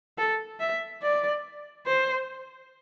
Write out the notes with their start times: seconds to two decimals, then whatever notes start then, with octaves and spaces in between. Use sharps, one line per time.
0.18 A4
0.60 E5
1.02 D5
1.87 C5